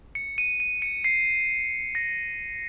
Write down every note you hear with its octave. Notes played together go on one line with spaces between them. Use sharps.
C#7
D#7
D#7
C#7
C7
A#6